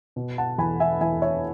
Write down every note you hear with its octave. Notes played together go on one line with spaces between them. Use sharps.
B2
F#5 A5
E2 G#5 B5
E5 G#5
E2 E5 G#5
C#5 E5